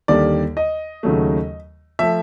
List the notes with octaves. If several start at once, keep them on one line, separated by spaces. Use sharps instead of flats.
D#2 D3 G3 A#3 D5
D#5
D#2 C#3 F#3 A3
F3 A3 E5